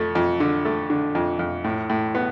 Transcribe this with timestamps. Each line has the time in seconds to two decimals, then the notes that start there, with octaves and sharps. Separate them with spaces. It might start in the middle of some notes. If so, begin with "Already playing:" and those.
Already playing: F2 A3
0.15 F2
0.40 D3
0.65 A3
0.90 D3
1.15 F2
1.39 F2
1.64 A2
1.90 A2
2.15 B3